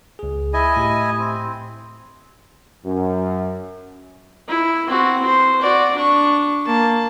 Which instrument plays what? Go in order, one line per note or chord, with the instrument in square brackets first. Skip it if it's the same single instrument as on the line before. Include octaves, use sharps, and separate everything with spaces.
[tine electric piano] C#2 G#4
[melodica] E4 D#5 G#5
[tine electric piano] A2 G4
[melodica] C4
[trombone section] F#2
[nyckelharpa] E4
C4 F#4
C5
F#4 D5
D4 C#6
A#3 A5